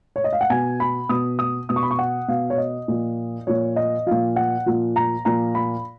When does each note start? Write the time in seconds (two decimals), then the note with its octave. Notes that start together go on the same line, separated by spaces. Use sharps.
0.16 C#5
0.24 D#5
0.33 F5
0.41 F#5
0.50 B2 G#5
0.80 B5
1.09 B2 D#6
1.39 D#6
1.69 B2 D#6
1.76 C#6
1.83 B5
1.91 C#6
1.99 F#5
2.28 B2 F5
2.50 C#5
2.58 D#5
2.88 A#2 F3
3.47 A#2 F3 C#5
3.76 D#5
4.06 A#2 F3 F5
4.36 F#5
4.66 A#2 F3
4.96 A#5
5.25 A#2 F3 A#5
5.55 B5